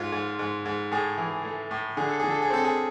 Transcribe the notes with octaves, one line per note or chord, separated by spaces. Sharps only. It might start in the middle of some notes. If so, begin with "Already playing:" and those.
Already playing: G#2 F4
G#2
G#2
G#2
A2 G#4
E3
A3
A2
D3 G#4
A4
D3 G#4
A4
G#4
C4 A4
G#4